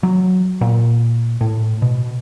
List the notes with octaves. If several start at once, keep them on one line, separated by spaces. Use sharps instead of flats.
F#3
A#2
A2
B2